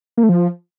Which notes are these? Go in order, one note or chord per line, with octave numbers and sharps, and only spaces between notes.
A#3
A3
F3